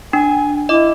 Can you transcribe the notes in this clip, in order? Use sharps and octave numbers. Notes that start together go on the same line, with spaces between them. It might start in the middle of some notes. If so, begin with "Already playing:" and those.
D4 G#5
E4 D#5 D6